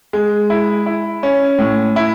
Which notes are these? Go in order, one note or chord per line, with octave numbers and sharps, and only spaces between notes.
G#3
E4
E4
C#4
A2
E4